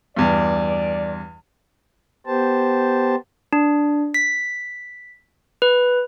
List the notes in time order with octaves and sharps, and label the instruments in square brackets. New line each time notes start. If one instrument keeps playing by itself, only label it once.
[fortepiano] E2 G2 [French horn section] D5
[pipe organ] B3 G4 C5 A5
[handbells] D4
B6
B4